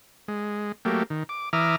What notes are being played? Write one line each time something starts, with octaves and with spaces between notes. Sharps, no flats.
G#3
F#3 A3 A#3 G4
D#3
D6
E3 E5 A#5 D6 D#6 F6